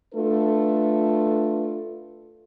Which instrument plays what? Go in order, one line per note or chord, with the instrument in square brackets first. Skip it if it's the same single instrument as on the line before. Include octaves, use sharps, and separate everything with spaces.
[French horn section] A3 D4 F4 A4 B4